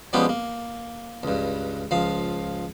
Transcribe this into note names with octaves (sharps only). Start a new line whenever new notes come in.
F3 G3 G#3 B3 C#4 G4
A#3
C#2 G2
C#2 F3 F5